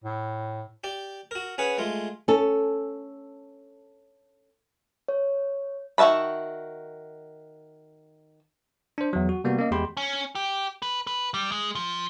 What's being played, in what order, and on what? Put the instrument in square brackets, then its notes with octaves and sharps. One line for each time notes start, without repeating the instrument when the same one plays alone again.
[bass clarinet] A2
[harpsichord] G4 D5
F#4 A#4
C#4 G#4 B4 F#5
G#3 A3 F4
[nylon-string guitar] C#4 A4
[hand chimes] C#5
[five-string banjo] D#3 F#4 E5 A5 B5
[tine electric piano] D4 C5
E2 F#3
F#4
C3 G3 A#3 B3 F#4
A#3 C#4 D#5
E2 G#3 G4 G5 B5 C6
[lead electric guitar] C#4
G4
B4
B4
G3
G#3
F3